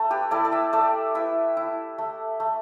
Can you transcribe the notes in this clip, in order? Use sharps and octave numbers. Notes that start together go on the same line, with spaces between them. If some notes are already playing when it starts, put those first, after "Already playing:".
Already playing: A3 A4
G4 B4
E4 A4 D5
D5
B4 E5
A3 A4 D5
E4 B4 E5
E4
A3
A3